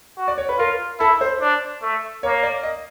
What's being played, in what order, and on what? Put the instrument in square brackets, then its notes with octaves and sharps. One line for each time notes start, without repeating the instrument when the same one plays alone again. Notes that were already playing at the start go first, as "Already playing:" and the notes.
[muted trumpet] F#4
[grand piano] D5
C#5
B4
[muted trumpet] F4 [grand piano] A#4
[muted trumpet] E4 [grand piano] A4
[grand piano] C5
[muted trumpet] D4
A3
[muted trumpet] A#3 [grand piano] C#5
[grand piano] D5
D#5